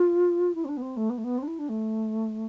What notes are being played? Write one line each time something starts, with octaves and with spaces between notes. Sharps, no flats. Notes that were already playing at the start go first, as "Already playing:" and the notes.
Already playing: F4
E4
C4
D4
B3
C4
A3
B3
A3
B3
C4
D4
E4
D4
A3